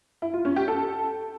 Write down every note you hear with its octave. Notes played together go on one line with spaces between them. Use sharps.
E4
F4
C#4
G4
A4